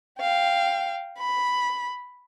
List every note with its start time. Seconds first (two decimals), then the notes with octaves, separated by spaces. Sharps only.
0.20 F5 G5
1.19 B5